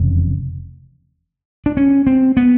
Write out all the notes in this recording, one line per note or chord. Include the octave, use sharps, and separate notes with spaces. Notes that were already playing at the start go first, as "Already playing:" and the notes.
Already playing: F1 E2 C#3
D4
C#4
C4
B3